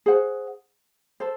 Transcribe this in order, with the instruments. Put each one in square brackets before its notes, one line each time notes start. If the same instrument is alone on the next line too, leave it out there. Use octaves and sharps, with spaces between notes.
[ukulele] G#4 C5 F#5
A4 C5